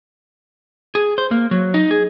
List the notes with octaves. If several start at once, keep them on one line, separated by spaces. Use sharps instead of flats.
G#4
C5
A#3
F#3
D#4
G#4